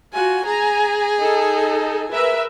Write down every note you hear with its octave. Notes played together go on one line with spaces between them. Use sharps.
F4 F#4 G#5
G#4 G#5 A#5
D#4 A4
A#4 B4 E5